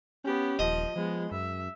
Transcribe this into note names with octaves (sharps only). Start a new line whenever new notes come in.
B3 C#4 G4
D#1 F3 D#5
F3 G#3 B3
F#2 E5